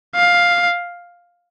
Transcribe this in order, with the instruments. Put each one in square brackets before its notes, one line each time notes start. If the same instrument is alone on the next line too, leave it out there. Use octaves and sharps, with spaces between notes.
[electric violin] F5